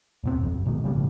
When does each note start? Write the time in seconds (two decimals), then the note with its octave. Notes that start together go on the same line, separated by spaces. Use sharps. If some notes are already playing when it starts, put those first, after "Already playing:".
0.23 D#2 B2 C4
0.39 G1 C2 F2
0.52 F#1
0.66 A#1 B2 D#3 G#3
0.84 C#3 G3 G#3 B3
0.95 A#1 A2 C#3 F3